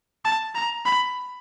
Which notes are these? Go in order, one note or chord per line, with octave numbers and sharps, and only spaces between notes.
A5
A#5
B5